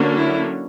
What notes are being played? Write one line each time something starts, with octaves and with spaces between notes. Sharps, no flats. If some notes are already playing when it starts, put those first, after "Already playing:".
Already playing: D3 F#3 A#3 C#4
E4